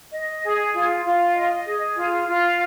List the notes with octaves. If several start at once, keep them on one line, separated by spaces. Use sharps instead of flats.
D#5
G#4
F4
F4
D#5
G#4
F4
F4